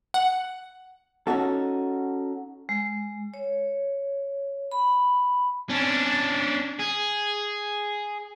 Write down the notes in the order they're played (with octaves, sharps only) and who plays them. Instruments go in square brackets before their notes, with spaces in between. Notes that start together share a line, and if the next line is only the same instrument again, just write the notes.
[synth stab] F#5
[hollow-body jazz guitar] C#4 D#4 F#4 A4
[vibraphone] G#3
C#5
B5
[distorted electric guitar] C#4 D4
G#4